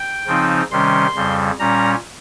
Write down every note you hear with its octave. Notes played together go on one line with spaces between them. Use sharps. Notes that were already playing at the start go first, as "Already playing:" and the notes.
Already playing: G5
C#3 F3 C4 D#4
C3 D#3 G3 C#4 C6
F2 C#3 G3
A#2 G3 C#4 A#5